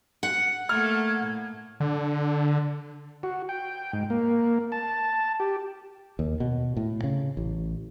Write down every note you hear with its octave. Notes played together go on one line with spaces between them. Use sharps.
F#5
A3 A#3 A4 F6 G#6
A2
D3
F#4
G5
G#2
A#3
A5
G4
D#2
B2
A2
C#3
A1